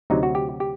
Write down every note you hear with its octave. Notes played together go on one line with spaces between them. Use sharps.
D2 C3 F#3 D#4
F#4
G4
G4